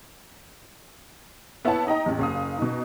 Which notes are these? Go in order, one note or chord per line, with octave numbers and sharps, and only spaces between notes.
B3 E4 C#5 F#5 A5
D#4 D#5 G5 A#5
A1 E2
F#1 F5 D#6
B2 D#4